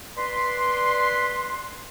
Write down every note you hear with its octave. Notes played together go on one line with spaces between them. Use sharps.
B4 D5 C6